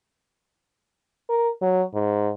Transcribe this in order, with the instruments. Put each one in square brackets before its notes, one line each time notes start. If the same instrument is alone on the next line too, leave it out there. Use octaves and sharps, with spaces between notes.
[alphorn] A#4
F#3
G#2